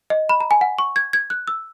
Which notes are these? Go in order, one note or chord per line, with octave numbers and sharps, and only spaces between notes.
D#5
B5
A#5
G#5
F#5
C#6
G#6
G#6
F#6
E6